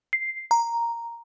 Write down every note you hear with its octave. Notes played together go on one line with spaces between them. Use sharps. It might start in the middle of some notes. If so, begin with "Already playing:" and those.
C7
A#5